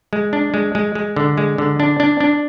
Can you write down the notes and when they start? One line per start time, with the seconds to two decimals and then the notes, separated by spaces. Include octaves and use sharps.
0.13 G#3
0.33 D4
0.54 G#3
0.75 G#3
0.95 G#3
1.16 D3
1.37 G#3
1.58 D3
1.80 D4
2.00 D4
2.20 D4